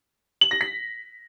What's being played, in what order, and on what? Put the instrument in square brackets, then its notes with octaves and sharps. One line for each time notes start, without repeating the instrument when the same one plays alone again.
[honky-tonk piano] F#7
A#6
B6